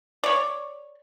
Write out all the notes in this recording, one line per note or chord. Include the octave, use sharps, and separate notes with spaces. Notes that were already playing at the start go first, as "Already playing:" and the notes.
C#5 D5